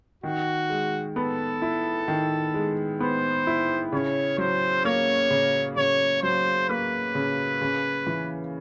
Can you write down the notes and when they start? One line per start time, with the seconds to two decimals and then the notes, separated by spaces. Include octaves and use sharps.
0.23 D#3 F#4
0.70 G#3
1.16 B3 A4
1.62 E4
2.08 D#3
2.54 G#3
3.00 B3 C5
3.47 E4
3.93 C#3 C#5
4.38 F#3 C5
4.85 A#3 C#5
5.31 C#3
5.76 C#3 C#5
6.23 F#3 C5
6.69 A#3 B4
7.15 C#3
7.61 C#3
8.07 E3